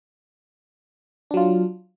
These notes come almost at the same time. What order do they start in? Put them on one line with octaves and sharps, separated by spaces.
D4 F#3 F4